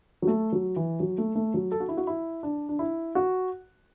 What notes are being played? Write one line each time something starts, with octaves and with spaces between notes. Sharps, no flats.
F#3
A3
F#3
E3
F#3
A3
A3
F#3
A4
F#4
E4
F#4
E4
D4
D4
E4
F#4